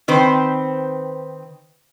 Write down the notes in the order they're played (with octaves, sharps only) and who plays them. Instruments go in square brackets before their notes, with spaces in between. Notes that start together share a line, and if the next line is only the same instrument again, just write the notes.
[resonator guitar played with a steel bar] D#3 C4 B4 C5